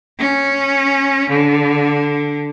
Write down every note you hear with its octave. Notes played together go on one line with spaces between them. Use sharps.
C#4
D3